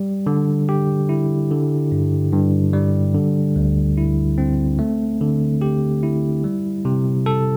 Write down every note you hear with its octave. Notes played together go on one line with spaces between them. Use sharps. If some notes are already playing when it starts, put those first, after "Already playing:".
Already playing: G3
D3
G4
E4
D3
G2
G2
G3
D3
D2
E4
C4
A3
D3
G4
E4
G3
C3
A4